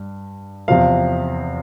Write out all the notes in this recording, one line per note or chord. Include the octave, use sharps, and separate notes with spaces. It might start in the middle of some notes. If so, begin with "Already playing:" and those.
Already playing: G2
E2 C3 F3 F5